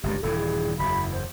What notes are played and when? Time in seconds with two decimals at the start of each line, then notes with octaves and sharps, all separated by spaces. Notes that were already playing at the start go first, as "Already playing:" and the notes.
0.03 G1 C#2 G2 G4
0.23 D#1 G2 E3 A4
0.37 G#4
0.79 F#1 E2 B5
1.13 C5